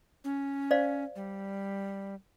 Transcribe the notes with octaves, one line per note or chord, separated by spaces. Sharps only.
C#4
C5 D5 F5
G3